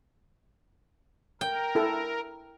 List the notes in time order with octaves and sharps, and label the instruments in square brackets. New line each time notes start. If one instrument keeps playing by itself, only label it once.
[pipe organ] A#4 [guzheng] G5
[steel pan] E4 A4